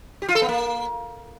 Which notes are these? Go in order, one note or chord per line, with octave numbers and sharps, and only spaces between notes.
G4
F4
A4
B3
A#3